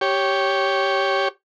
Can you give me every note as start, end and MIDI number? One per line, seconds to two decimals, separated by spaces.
0.01 1.28 67
0.01 1.28 73